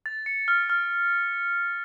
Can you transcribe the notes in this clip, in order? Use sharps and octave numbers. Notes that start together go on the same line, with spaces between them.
A6
C#7
F6
F6